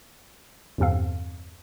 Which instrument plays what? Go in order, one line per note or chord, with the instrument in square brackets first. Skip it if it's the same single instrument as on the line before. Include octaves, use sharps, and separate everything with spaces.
[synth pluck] E2 G2 C3 C4 A4 F5